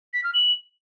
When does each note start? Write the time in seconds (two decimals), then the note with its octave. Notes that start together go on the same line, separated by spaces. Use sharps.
0.14 B6
0.24 F6
0.34 F#7